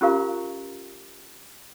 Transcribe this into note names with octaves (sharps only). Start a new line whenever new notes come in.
C#4 F4 G4 A#4 F5 A#5